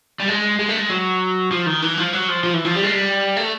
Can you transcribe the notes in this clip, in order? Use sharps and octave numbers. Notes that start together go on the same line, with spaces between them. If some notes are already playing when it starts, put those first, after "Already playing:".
G3
G#3
G#3
A3
G#3
F#3
F3
D#3
E3
F3
F#3
F3
F3
E3
F3
G3
G#3
G3
A3